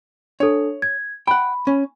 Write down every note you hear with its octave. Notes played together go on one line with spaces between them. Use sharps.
D4 A4 C#5
G#6
F#5 G5 B5
C#4